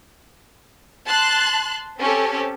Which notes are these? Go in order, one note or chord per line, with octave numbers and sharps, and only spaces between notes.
A5 C6 F#6
C4 C#4 G4 A4